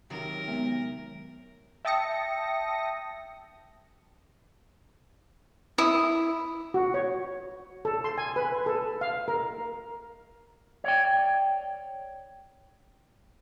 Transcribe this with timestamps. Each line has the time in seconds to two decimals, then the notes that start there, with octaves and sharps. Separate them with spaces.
0.10 C3 D#3 F#3 A#4
0.48 G#3 B3 E5
1.85 E5 G5 A5 D#6 A#6 C#7
5.78 E4 D#6
6.74 F#4
6.94 C#5
7.85 A4
8.04 C6
8.18 G#5
8.36 B4
8.66 A4
9.01 F5
9.28 A#4
10.84 C#5 D5 G5